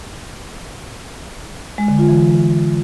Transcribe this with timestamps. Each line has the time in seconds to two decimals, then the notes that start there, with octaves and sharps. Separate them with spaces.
1.78 G#3
1.88 D3
1.98 F4
2.09 E3